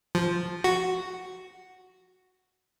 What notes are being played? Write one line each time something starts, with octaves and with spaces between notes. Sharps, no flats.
F3
F#4